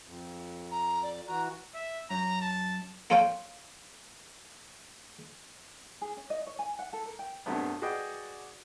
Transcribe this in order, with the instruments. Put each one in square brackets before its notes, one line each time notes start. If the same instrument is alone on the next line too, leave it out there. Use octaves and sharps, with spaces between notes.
[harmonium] F2
[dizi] A#5
D5
[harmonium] E3 F#4 [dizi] A#5
[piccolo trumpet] E5
[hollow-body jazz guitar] F#2 [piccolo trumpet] A#5
[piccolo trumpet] A5
[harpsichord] A#3 F4 A4 C#5 F5 G5
[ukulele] G#4
C#4
D#5
C#5
G#5
F#5
A4
A#4
G5
[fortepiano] C2 G2 C3 F#3 A3 B3
F#4 G#4 B4 D5 D#5 G5